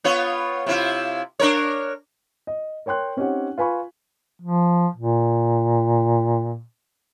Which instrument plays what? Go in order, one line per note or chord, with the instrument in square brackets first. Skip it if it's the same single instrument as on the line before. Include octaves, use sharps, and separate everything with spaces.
[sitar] B3 F4 C#5
C3 E4 F4
D4 A#4 C#5
[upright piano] D#5
A#4 C#5 G5 C6 F#6
C4 C#4 D#4 G4 C#5 F#5
F4 B4 G#5 B5 C#6
[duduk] F3
A#2